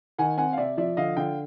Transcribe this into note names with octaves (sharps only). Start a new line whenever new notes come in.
D#3 F#5 G#5
C4 F#5 G#5
F5
C3 D5 E5
F3 D5 E5
D3 D#5 F5
D3 F5 G5